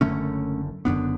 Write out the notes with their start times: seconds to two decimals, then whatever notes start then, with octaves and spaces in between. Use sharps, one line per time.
0.01 F#1 F#2 D3 A3 C#4
0.85 F#1 F#2 D3 B3 D4